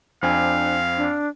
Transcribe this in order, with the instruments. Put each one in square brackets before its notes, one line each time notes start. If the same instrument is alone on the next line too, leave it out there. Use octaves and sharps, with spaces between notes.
[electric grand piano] F2 C4 G#5 [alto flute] D4 [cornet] F5
[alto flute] D4